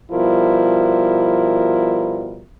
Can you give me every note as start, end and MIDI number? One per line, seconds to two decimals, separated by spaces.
0.12 2.43 47
0.12 2.43 53
0.12 2.43 55
0.12 2.43 64
0.12 2.43 70